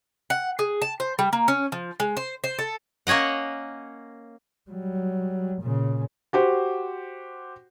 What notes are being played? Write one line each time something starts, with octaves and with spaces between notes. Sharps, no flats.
F#5
G#4
A5
C5
G3
A#3
C#4
F3
G#3
C5
C5
A4
A#3 C#4 C#5 D#5 F#5
F#3 G3
A#2 C#3
F#4 G4 C5